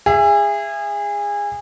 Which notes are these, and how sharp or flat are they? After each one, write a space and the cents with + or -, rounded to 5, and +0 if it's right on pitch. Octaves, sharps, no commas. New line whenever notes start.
G#4 -25 E5 +25